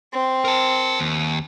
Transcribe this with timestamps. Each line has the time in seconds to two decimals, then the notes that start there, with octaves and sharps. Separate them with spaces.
0.13 C4
0.45 A#4 A5
0.99 D#2